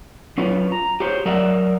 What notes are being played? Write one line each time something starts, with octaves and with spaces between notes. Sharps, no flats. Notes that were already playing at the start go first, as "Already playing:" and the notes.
F#3 C#4 F4 B4
A#5
G4 G#4 C5 C#5
F#3 A#4 D5 E5 F#5